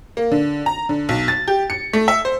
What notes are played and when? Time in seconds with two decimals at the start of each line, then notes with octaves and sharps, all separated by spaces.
0.17 A#3
0.32 D3
0.66 A#5
0.89 D3
1.09 B1
1.28 A6
1.48 G4
1.70 C#7
1.93 A3
2.08 E5
2.25 C5